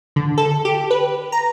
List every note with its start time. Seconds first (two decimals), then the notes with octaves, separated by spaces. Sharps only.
0.16 D3
0.38 A4
0.65 G4
0.91 B4
1.32 A#5